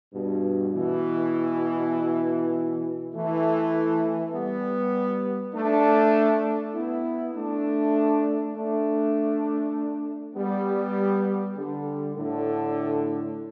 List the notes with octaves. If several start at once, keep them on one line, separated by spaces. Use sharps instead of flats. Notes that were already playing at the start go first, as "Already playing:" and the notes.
G2 B2
B2 E3
E3 A3
G3 B3
A3 D4
B3 E4
A3 D4
A3 D4
G3 B3
D3 G3
A2 D3